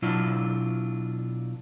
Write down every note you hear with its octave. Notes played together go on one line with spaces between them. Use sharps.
B2 F#3 D4 E4 F4